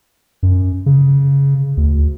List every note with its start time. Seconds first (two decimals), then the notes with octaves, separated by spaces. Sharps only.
0.43 F#2
0.86 C#3
1.77 D2